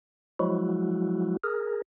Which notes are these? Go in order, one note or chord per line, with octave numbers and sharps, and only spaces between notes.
F3 F#3 G#3 E4 F#4
G#4 A#4